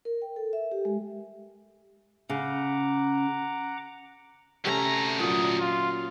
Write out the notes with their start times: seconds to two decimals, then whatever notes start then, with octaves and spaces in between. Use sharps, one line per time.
0.05 A#4
0.22 G5
0.36 A4
0.53 E5
0.72 G4
0.85 G#3
2.29 C#3 F#5 A#5 D6
4.65 D2 C3 A3 C#4 A#5
5.20 A#2 F#3 D#6
5.60 F4